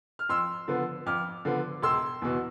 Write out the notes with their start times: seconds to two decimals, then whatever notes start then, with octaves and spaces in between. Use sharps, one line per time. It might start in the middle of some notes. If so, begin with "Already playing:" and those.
0.19 F6
0.29 F2 C6 E6
0.68 D3 F3 B3
1.06 F2 D6 F6
1.45 D3 F3 B3
1.82 E1 C6 E6
2.22 E2 B2